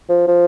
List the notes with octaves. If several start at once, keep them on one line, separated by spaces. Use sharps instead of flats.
F3
F3